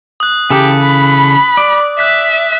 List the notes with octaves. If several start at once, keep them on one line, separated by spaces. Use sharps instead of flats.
D#6 F#6
C#3 E3 G4 A4
B5
D5
E5 F#6 B6